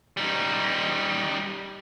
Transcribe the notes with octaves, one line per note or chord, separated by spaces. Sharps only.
G3 D#4